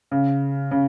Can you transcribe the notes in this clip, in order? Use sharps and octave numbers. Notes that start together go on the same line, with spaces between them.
C#3
C#3